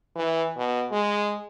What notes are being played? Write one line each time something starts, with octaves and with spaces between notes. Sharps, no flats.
E3
B2
G#3